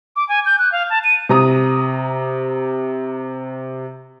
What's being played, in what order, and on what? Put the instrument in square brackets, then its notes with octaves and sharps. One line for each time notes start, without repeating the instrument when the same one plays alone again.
[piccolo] D6
G#5
G6
F#6
F5
A5
D#7
[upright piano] C3 A#5 D#6